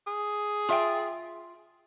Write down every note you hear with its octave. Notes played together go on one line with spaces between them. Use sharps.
G#4
F4 E5 G5